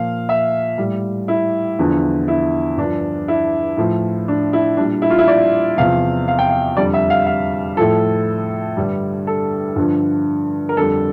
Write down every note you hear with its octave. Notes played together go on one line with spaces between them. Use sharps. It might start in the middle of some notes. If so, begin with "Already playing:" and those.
Already playing: A#2 F3 F5
E5
A2 G3
E4
E2 D3 F3
E4
G2 F3 D4
E4
A2 F3
D4
E4
A#2 G3 D4
E4
F4
E4
D5
E2 C3 F3 F5
F5
G5
F5
F2 D3 G3 D5
E5
F5
F5
A2 F3 A4
G2 D3 G3
A4
G2 D3 F3
A#4
F2 D3 G3 A4